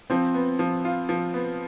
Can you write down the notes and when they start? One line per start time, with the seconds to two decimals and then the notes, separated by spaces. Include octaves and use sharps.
0.10 F3 C4
0.34 B3
0.59 F3
0.85 F4
1.09 F3
1.34 B3